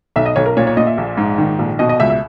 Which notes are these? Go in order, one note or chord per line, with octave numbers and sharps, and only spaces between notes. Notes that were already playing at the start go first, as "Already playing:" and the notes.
B1 E5
D#5
B1 C#5
A#4
A#2 C#5
C#5
A#2 D#5
E5
A#1
G#2
D#3
A#1
B2 D#5
D#5
C#2 E5
E5